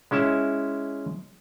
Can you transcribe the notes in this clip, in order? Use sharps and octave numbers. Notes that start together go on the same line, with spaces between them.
G#3 C#4 E4 E5